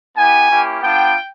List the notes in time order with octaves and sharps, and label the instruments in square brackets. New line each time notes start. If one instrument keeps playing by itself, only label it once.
[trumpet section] B3 E4 G4 G#5
A#3 C#4 E4 G4
B3 D4 F4 G5